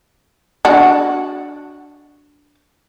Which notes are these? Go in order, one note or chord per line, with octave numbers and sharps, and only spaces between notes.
D4 F#4